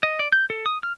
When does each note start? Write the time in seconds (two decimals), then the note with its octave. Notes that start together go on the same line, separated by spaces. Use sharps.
0.03 D#5
0.19 D5
0.32 G6
0.50 A4
0.66 D#6
0.83 F6